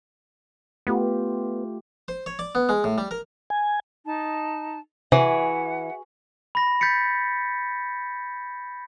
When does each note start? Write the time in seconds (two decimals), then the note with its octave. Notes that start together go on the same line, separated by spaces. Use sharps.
0.87 A3 B3 F4 G4
2.08 C5
2.26 C#5
2.39 D5
2.55 B3
2.69 G#3
2.84 A2
2.98 G3
3.11 A#4
3.50 G#5
4.05 D#4 A5
5.12 C3 E3 F#4 G#4 E5 F#5 D6
6.55 B5 A#6
6.81 G6 A6 B6 C#7